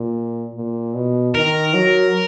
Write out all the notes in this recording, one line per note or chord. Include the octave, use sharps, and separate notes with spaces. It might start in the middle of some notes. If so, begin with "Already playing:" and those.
Already playing: A#2
A#2
B2
D#3 A#4
F#3